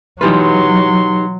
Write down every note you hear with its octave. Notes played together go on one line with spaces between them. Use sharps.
B2 E3 F#3 D#4 F4 G4 B4 C6